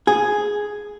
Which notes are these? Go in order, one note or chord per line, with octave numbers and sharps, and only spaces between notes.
G#4